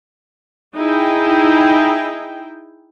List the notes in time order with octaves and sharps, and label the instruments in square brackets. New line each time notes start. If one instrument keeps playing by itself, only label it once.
[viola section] D#4 E4 G#4 G5